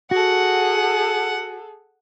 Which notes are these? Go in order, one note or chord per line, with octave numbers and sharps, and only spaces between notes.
F#4 G#4 A4 F#5